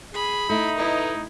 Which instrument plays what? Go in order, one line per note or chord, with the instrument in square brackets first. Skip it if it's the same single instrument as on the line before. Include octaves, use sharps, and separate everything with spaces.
[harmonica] G#4 [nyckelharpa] B5
[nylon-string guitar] A3 [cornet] D#4 [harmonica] E4
[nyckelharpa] E4 [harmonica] B4 D#5 A#5